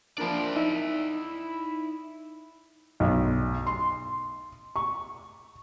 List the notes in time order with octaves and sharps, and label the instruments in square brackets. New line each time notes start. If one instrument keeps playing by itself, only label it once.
[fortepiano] F3 A#3 D4 [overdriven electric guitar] E4 D5
[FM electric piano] D#4 [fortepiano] E5
[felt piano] B1
C6
C#6